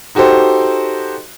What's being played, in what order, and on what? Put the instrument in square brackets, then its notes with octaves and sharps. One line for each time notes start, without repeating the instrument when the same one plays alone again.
[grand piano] D#4 F#4 G4 A4 C5